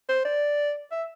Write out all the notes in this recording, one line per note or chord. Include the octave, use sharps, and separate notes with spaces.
C5
D5
E5